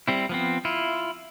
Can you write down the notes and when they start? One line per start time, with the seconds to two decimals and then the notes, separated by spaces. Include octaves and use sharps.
0.08 G3 C4 E4
0.29 F3 B3 C4
0.65 E4 F4